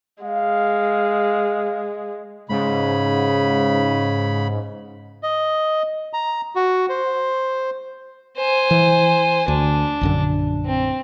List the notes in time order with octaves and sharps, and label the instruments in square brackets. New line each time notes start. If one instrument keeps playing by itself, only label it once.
[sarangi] G#3 [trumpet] F5
[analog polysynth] G#2 [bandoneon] C#3 B5
[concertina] D#5
A#5
F#4
C5
[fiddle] C5 G#5
[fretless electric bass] E3
[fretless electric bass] D2 [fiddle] D4
[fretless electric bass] A#1 F#2 D3
[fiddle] C4